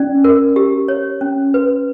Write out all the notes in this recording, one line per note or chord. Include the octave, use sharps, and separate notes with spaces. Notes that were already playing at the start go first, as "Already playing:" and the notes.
Already playing: C#4 D5
A#4
G4
C#5
C#4
B4